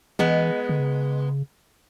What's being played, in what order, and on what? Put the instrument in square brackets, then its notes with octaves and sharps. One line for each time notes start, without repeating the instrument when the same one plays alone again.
[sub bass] E3 [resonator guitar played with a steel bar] G#3 B3
[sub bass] D3
C#3